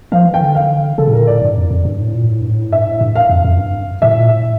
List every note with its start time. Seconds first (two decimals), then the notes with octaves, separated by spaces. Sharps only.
0.12 F3 F5
0.26 E3
0.34 G5
0.41 D3
0.55 F5
0.98 C#3 A4
1.07 A2
1.13 A#2 A#4
1.27 A2 D5
1.42 G2
1.57 F2
1.71 F2
1.85 G2
2.00 A2
2.14 A#2
2.28 A2
2.41 G2
2.51 A2
2.72 G2 E5
2.87 A2
3.01 G2
3.16 F5
3.30 F2
3.44 F2
3.59 G2
4.02 A2 E5
4.16 A#2
4.31 A2